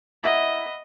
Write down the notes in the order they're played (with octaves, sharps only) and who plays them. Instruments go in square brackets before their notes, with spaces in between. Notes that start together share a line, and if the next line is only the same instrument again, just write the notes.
[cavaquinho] E4 A#5 [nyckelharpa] D#5 [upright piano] E5 F#5 B5